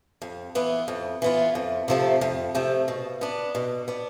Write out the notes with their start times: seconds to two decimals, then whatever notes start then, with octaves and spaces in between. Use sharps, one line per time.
0.22 F2
0.55 E3 B3 F4
0.88 F2
1.22 E3 B3 F4
1.55 F2
1.88 C3 F3 A3
2.21 F2
2.55 C3 F3 A3
2.88 B2
3.21 B3 D4
3.55 B2
3.88 B3 D4